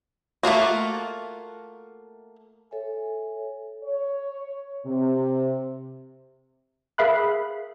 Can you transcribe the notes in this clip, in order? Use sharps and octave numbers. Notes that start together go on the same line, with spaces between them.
A3 A#3 F4 F#4
A4 C#5 E5 G#5
C#5
C3
G#4 A#4 E5 F5 B5 F#6